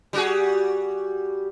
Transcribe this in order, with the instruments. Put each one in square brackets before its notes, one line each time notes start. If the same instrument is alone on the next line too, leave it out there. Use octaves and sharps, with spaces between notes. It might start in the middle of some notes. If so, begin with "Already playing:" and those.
[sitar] G3 F#4 G#4